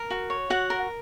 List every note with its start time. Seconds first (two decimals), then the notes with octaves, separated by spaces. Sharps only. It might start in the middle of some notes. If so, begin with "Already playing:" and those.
Already playing: A#4
0.10 F#4
0.30 C#5
0.50 F#4 F#5
0.70 A#4